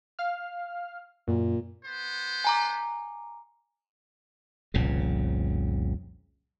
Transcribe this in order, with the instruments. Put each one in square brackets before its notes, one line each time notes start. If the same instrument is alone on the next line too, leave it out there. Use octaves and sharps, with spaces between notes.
[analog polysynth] F5 F6
[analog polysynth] F#2 [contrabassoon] A#2
[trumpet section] B3 C5
[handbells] G#5 A#5 D6
[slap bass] F1 C2 A#2 C#3